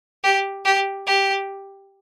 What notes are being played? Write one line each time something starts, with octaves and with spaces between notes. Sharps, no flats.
G4
G4
G4